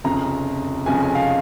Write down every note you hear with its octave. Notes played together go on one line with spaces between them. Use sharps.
F1 F2 C#3 A#5
F1 F2 C#3 G#5
G#5
F5